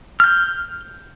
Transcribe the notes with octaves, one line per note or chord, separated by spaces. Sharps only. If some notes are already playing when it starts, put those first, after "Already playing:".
F6 G6